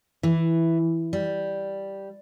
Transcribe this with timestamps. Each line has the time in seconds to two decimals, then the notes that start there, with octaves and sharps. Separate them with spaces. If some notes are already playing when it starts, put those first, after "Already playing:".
0.23 E3
1.13 G3